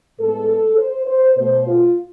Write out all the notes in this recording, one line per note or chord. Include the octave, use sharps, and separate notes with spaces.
A2 G#3 B3 A4
C5
C5
B2 A3 C5
F4